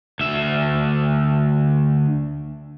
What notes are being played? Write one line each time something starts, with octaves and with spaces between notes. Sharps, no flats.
D2 E5